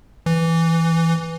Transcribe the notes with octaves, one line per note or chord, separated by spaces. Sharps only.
E3